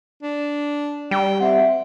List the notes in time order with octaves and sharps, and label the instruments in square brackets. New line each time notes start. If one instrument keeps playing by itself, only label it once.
[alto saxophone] D4
[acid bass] G3 [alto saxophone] G5
[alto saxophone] C4 [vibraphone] E5 F#5